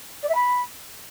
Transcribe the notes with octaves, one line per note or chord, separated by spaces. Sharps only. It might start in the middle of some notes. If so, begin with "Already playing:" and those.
D5
E5
B5